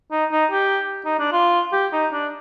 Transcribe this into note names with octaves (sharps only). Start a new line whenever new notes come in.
D#4
D#4
G4
D#4
D4
F4
G4
D#4
D4